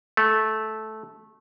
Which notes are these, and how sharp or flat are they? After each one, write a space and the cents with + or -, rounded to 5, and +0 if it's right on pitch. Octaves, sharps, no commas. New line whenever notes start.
A3 -10